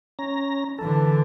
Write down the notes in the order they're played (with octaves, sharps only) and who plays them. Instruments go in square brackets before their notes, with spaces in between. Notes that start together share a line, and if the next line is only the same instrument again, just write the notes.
[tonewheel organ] C#4 A#5
[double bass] D3 E3 [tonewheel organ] A4